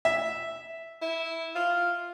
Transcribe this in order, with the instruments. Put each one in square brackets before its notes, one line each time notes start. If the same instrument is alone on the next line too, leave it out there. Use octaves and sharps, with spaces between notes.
[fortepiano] E5
[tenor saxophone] E4
F4